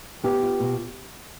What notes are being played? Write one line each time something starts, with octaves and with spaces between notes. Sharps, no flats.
B3 G4
F4
B2